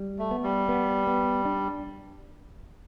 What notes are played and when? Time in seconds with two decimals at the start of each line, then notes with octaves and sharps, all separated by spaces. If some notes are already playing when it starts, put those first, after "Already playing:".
Already playing: G3
0.19 A3
0.31 B3
0.43 G3
0.69 B3
1.07 B3
1.45 D4